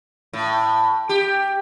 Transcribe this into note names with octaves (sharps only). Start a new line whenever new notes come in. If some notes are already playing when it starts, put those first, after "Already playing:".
A2
G4